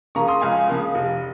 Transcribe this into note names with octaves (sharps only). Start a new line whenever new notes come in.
C#3 F3 A#3 A#5 C#6
C6 D#6
C#2 F5 G#5
C#3 F3 A#3
F1